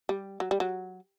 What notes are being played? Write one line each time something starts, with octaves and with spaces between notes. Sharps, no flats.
G3
F#3
G3
F#3